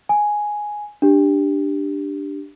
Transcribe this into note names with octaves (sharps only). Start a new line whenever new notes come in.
G#5
D4 G4